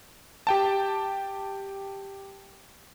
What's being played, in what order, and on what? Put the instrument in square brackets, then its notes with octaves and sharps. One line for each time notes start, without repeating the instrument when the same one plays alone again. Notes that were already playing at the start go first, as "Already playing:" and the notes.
[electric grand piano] G4 G5 A5